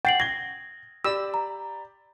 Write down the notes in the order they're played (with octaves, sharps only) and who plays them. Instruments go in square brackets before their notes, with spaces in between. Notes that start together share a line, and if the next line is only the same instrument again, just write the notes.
[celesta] F#5 C7 F#7 [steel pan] G5 [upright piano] A6
[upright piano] G#6 G7 [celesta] A#6
[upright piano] G4 D5 B5 [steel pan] E6
[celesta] A#5